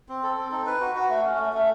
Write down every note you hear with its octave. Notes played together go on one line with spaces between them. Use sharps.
C4
A4
C4
D#4
B4
F#4
F#4
A3
C#4
A3
A3